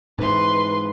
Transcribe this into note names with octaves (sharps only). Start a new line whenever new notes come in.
G#2 E3 B4 C6